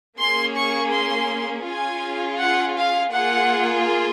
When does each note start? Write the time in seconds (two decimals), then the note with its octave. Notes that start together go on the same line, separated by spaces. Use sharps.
0.19 A#3 C#4 G#4 C6
0.56 C#6
0.92 C6
1.66 C#4 F4 G#4 G#5
2.39 F#5
2.77 F5
3.12 A#3 F4 G#4 F#5